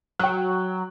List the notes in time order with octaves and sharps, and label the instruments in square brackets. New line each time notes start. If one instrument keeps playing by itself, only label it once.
[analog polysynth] F#3 [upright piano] G5 F#6